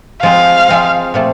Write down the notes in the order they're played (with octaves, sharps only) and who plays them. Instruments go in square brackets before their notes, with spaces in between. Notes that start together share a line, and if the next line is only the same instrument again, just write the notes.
[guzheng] F3 G#3 C4 [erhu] F5
[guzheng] F3 G#3 C4
A#2 F3 A3 C4